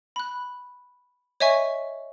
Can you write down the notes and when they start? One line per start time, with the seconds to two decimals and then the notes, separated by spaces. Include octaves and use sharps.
0.16 B5 F#6
1.40 C#5 D#5 E5 G#5 C#6